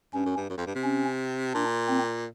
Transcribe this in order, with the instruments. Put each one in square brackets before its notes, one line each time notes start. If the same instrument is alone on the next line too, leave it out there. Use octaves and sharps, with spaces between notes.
[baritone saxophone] G2 [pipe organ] C#4
[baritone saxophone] F#2
G2
F#2
F2
G2
C3
[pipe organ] C#4
[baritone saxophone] A#2 [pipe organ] D4
[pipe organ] C4